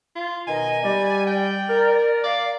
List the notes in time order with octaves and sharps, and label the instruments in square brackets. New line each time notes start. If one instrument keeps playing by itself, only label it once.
[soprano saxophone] F4
[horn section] B2 D#3 A#5 [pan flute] D#5 [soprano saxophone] G#5
[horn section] G3 [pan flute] D5
[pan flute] D5 [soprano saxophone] G5
[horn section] A#4
[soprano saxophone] D5 [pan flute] F5